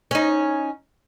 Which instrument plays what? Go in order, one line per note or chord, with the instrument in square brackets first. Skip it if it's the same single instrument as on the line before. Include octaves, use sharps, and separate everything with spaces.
[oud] C#4 D#4